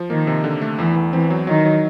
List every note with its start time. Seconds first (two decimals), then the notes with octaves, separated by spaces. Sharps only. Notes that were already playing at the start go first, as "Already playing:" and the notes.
Already playing: F3
0.10 D#3 A#3
0.27 C3
0.44 D3
0.61 A3
0.79 E2 E3
0.96 E2
1.13 E3 C4
1.30 F#3
1.47 D#3 F#3
1.65 F#3